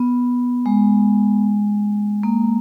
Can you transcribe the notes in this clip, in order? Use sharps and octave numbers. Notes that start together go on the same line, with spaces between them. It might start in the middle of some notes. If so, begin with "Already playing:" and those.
Already playing: B3
G#3
A#3